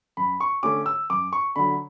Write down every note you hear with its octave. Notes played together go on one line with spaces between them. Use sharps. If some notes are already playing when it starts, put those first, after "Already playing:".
F#2 B5
C#6
D3 A3 C#4 D6
E6
F#2 D6
C#6
D3 F#3 B5